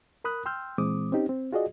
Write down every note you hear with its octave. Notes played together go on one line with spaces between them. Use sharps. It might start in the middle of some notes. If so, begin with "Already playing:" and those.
A#4 B5 D#6 F#6
G5 C6 E6 F6 G6
A#2 E3 G#3 C4 D6 D#6
C4 C#4 D#4 G4
C4
F4 F#4 G#4 D5 D#5